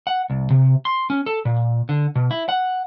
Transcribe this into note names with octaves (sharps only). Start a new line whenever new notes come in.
F#5
C2
C3
C6
C#4
A4
A#2
D3
B2
E4
F#5